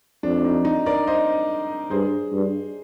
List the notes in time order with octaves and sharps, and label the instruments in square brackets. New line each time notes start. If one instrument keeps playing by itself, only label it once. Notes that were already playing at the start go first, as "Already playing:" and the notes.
[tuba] F2 [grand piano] D4
[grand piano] D#4
D#4
A#4 D5
C5 D#5
[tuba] G2 [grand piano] G#4 C5
[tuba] G2